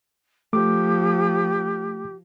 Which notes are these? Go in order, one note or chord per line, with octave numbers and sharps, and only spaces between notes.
F3 A3 G4 D6